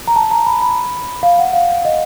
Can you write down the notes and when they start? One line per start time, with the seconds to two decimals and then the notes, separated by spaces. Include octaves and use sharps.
0.08 A#5
0.16 A5
0.31 A#5
0.46 B5
0.62 B5
1.23 F5
1.39 F#5
1.53 F5
1.85 D#5